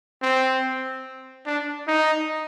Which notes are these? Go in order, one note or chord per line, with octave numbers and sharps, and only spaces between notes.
C4
D4
D#4